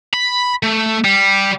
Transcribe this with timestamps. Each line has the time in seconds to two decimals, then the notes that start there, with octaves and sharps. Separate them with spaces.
0.14 B5
0.63 A3
1.05 G3